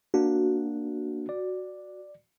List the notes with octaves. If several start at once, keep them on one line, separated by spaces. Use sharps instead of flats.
A#3 D4 F#4
D5